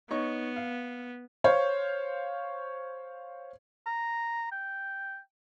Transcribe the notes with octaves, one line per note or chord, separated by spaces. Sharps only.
B3 D#4 C#5 C#6
F5
C5 C#5 F5
A#5
G5